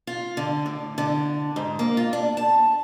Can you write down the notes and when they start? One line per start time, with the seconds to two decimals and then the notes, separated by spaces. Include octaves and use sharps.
0.07 F4
0.37 D3
0.66 A2
0.98 D3
1.56 G#2
1.79 A#3
1.97 F4
2.13 D4
2.37 A5